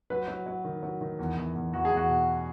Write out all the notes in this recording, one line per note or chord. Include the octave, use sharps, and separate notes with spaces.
F#3 B4
F#3
F#3
D#3
F#3
D#3
E2
E2
E2
E2 F#4
G#4
E2
F#4
B2